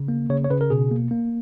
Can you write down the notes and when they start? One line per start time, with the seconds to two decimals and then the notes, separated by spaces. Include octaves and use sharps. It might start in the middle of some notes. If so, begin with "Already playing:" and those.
Already playing: C#3
0.08 A#3
0.29 C#3 C#5
0.44 C#5
0.50 C#3 B4
0.61 A#4
0.70 B2 G#4
0.91 A#3
1.11 A#3